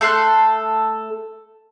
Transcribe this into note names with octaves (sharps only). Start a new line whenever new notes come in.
A3 A4 C6 F#6